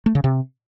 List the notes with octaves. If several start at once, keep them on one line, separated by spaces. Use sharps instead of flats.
A3
C#3
C3